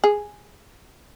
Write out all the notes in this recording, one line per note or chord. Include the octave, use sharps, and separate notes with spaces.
G#4